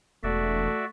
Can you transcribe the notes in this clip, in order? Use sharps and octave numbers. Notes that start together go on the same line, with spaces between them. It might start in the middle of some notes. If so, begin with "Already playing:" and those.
E1 A3 F#4 D5 E5